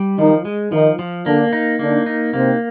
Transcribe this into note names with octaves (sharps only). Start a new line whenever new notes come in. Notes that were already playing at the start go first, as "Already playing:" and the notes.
Already playing: G3
D#3 F3 D#4
G#3
D#3 F3 D#4
F3
D3 A#3 D4
D#4
D3 A#3 D4
D#4
C3 A#3 C4